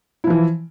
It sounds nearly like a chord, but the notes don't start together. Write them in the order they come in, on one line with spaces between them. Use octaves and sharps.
E4 F3 E3